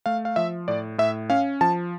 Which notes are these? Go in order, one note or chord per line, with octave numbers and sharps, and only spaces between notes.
A3 F5
F5
F3 E5
A2 D5
A2 E5
C#4 F5
F3 A5